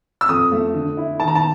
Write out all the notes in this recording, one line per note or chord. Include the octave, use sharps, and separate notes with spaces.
E6
F2 D#6
A3
D3
E4
D#3 A5
A#5
A5